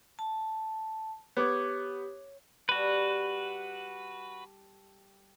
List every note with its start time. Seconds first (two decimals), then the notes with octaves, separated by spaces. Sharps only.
0.19 A5
1.37 B3 G4 C#5 D6 G#6
2.69 G3 F#4 A4 B4